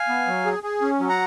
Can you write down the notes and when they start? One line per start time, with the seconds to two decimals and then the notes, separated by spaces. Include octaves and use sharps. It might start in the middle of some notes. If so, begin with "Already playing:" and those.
Already playing: F5 G#5
0.09 B3
0.27 F#3
0.46 G#4
0.63 G#4
0.82 C#4
1.00 F#3
1.09 F#5 A#5